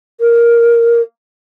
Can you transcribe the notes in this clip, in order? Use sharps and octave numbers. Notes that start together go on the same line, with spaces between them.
A#4